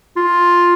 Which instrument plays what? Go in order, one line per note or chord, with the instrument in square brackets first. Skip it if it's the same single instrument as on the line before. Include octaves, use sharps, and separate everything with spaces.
[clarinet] F4